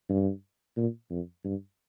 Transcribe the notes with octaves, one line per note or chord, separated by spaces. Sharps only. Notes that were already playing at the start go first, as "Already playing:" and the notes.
G2
A#2
F2
G2